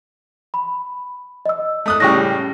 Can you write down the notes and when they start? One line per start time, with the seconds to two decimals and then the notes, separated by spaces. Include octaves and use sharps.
0.54 B5
1.46 D#5 E6
1.86 A3 D#6 F#6
2.00 A2 C#3 G3 G5 C#6 A#6